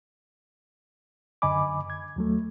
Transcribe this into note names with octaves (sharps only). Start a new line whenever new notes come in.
F#2 D3 D#5 G#5 B5 D6
G#6
D#2 F#3 A3